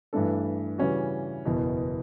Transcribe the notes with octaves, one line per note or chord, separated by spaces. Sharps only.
G2 E3 A3 D4 A4
C#3 E3 G3 C#4 F#4
F#1 E2 B2